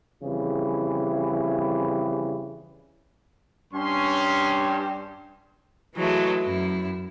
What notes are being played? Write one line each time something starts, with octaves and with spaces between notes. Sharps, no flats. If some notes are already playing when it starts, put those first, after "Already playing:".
F2 C#3 E3 G3
G2 C#4 C6
E3 F#3 G#3 A3
F#2 E4